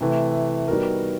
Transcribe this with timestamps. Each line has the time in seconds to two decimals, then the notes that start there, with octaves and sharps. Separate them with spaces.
0.01 C3 E3 A3
0.68 G3 B3 D#4 F#4 A#4